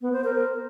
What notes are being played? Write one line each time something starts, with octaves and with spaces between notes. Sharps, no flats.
B3
C5
A#4